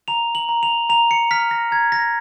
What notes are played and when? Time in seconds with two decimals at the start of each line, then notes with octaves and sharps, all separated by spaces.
0.08 A#5 F7
0.35 F#7
0.49 A#5
0.63 F7
0.89 A#5 F7
1.11 C#7
1.31 F6 B6
1.51 A#6
1.71 A#5 G#6
1.92 A#6